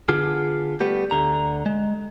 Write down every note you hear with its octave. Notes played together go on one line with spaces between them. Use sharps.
D3 B3 D4 F4 G#4
G3 A3 B3 G4
D2 D3 A#5
G#3